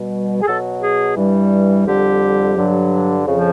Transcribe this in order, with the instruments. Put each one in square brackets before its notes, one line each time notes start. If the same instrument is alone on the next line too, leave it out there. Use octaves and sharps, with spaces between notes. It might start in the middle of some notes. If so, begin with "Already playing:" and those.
Already playing: [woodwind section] B2 G3
G#4
B2 F#3 A4
G#4
G2 E3 G3
F2 D3 G3 G4
G2 D3 F#3
F2 C#3 F3